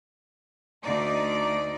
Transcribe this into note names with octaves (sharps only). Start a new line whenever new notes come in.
D2 D#4 D5